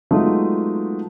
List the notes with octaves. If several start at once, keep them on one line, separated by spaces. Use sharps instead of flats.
F#3 G#3 A3 B3 D#4 F4